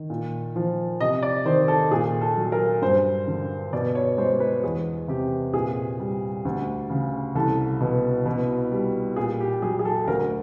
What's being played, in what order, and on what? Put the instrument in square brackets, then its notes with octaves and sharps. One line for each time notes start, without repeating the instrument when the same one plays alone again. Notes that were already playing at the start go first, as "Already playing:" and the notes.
Already playing: [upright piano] D#3
A#2
F3
C3 D#5
D5
D#3 C5
A4
A#2 G#4
A4
F#3
A#4
G2 C5
D3
B2 D5
C#5
G#3 C5
B4
E2 G#4
C3 G4
A#2 G#4
G3
D2
C#3
C2 A4
B2
B2
G3
A#2 G#4
G4
F#3 G#4
G#4
A4
D2 A#4